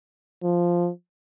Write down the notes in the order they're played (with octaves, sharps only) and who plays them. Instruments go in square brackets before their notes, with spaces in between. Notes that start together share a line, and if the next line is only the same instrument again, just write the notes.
[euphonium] F3